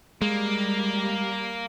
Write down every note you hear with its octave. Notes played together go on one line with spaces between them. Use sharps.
G3 G#3 A#3